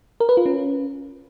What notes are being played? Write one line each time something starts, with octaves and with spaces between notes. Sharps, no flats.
A#4
B4
F4
C#4